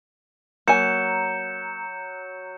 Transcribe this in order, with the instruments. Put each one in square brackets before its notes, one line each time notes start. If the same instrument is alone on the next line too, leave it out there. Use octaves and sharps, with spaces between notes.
[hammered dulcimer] F#3 [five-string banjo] A#3 G#5 [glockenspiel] G6 C#7 E7